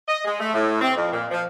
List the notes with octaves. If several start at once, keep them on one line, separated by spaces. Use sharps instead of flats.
D#5
G#3
A3
A2
C4
F2
A#2
F3